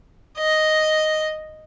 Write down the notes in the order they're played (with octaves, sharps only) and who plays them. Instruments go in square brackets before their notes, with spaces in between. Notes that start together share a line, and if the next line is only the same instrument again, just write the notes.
[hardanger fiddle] D#5